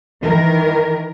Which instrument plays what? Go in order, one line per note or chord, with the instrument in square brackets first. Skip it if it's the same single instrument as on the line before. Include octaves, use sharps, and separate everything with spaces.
[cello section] D#3 E3 A#4